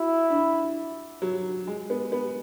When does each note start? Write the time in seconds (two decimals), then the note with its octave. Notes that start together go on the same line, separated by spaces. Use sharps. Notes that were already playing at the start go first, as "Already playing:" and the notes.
Already playing: E4 F#4
0.30 D4
1.22 F#3
1.67 G#3
1.90 B3
2.12 B3